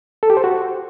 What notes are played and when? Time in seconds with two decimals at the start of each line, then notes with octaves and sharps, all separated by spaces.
0.23 A4
0.30 G4
0.37 C5
0.44 F#4